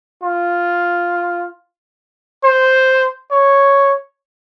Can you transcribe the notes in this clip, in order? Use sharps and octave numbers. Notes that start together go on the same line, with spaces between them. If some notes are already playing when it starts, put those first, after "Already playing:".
F4
C5
C#5